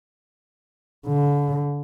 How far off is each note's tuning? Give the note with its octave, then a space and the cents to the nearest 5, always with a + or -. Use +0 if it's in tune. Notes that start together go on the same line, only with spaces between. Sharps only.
D3 -35